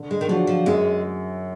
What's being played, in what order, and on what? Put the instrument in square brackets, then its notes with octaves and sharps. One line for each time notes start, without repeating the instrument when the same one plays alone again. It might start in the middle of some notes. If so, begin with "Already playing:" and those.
Already playing: [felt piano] D3
[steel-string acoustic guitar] G#3
D#3
[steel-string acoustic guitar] F3 [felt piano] F#3 D4 F#4
[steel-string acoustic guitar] F3
[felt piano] F#2 [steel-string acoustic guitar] G#3